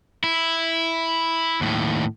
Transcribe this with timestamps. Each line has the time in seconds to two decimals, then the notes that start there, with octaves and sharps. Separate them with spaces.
0.24 E4
1.61 D#2 A2